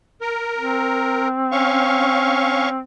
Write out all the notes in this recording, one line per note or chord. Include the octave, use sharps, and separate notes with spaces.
A#4
C4
C#4 F5 C#6